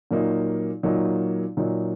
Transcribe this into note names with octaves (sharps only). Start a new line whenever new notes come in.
A#2 F#3 A#3 D#4
A#2 F#3 A#3 D#4
A#2 F#3 A#3 D#4